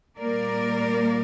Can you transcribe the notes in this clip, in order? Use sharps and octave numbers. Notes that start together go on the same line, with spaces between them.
A#2 G3 A#3 A#4 D5